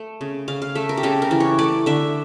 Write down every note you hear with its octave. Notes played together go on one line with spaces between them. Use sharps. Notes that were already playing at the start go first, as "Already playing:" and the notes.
Already playing: A3
C#3
C#3 F5
F5
A3 E5
A#4
G4
C#3 A4
A#4
E3
C#5
A3 D5
D3 E5